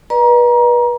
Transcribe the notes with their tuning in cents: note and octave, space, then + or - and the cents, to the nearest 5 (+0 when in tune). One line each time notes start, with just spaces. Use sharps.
B4 -30 D5 +40 A#5 +25